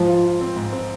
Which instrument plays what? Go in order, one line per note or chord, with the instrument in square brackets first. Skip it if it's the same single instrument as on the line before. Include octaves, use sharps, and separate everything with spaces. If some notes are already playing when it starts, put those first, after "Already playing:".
Already playing: [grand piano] G#2 [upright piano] F3
[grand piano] F4
F4
C4
G#2
C4